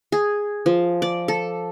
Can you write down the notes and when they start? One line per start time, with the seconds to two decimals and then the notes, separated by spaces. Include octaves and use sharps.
0.12 G#4
0.66 F3
1.02 D5
1.28 A4